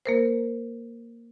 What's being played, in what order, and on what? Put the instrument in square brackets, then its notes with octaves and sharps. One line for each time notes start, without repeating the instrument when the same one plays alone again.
[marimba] A#3 A#4 C5